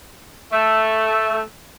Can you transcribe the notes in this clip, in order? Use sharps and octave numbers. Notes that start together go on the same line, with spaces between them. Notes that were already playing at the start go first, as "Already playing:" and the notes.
A3